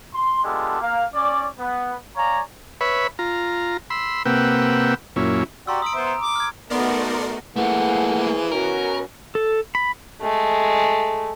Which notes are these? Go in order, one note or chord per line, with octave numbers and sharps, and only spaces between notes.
C6
G#3 B3 D4 F4 G4 A4
A#3 F5
C#4 D5
B3
C#5 D5 F5 G#5 A#5
B4 C#5 E5 B5
F4 A#5
B5 C6 E6
C3 A#3 B4 F#5 G5 E6
F#2 A#2 C#4 E4
F#4 G4 D5 A#5 C6 E6
B5 D#6 D7
B3 C5 E5
A#5
D6
F6 G#6
A3 B3 D#4 F#4 A#4 D5 C6
E3 F3 A3 A#3 G#4 F#5
B2 C#4 F#4 A#4
A4
B5
G#3 A3